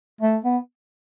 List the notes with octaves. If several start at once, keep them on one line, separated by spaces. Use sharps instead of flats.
A3
B3